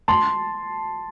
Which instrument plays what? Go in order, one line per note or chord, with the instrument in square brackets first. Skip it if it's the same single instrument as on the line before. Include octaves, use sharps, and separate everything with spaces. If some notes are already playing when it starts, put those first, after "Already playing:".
[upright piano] A5 C6